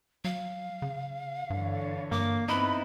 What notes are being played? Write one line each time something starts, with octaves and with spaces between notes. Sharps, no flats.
F#3 F5
C#3
G2 D3 E3 C#5
G2 A#3 D6
B3 C4 D#4 E4 B4 B5